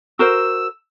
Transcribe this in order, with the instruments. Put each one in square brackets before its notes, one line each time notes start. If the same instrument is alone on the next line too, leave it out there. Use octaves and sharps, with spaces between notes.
[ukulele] F#4 A#4 C5 [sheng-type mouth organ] E6